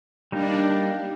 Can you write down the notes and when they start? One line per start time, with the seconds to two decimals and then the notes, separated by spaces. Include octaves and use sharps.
0.32 G3 A#3 D4 D#4